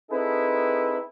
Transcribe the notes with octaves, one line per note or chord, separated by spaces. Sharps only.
C4 D#4 E4 G#4 A4 B4